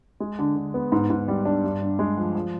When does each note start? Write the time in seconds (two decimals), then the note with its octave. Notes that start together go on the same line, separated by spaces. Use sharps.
0.20 G#3
0.39 D3
0.56 D3
0.74 B3
0.92 G#2
1.10 G#2
1.28 G3
1.45 D4
1.64 G2
1.81 G2
1.99 G#3
2.17 F3
2.35 F3